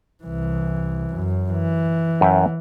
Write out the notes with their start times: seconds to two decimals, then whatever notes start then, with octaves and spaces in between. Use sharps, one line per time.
0.24 C2 E3
1.15 F#2
1.52 E3
2.21 F#2 E5 G5